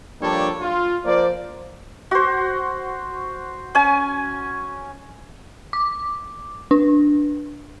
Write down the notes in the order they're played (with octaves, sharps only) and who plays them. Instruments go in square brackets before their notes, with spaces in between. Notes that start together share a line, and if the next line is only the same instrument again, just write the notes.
[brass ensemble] F3 G3 A#3 D4 A4 C#5
F4
F3 A#3 C5 D5
[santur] F#4 C5
C#4 G#5
[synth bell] D6
D4